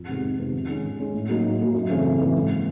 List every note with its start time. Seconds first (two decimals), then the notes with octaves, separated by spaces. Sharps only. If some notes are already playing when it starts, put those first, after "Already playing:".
Already playing: F2
0.08 C3 D#3 G#3 B3
0.23 F2
0.38 C3 D#3 G#3 B3
0.53 D#3
0.69 G#3 C#4
0.84 D#3
0.99 G#3 C#4
1.14 A2
1.29 F#3 A#3 D#4
1.44 A2
1.59 F#3 A#3 D#4
1.74 F#2
1.89 C#3 E3 A3 C4
2.05 F#2
2.20 C#3 E3 A3 C4
2.35 G#2
2.50 F3 A#3